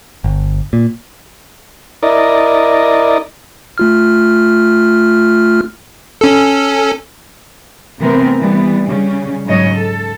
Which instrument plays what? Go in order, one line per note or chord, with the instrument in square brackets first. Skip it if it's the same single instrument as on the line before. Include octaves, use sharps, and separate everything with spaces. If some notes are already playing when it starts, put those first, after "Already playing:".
[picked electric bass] G1
A#2
[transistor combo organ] E4 A#4 D5 D#5
[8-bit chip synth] A3 F4 F6
C#4 A4
[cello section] C3 E3 A3 B3 C4 A#4
E3 G3 B3
C#3 G3 C#4
G#2 C#3 F#3 C#5 D#5
A4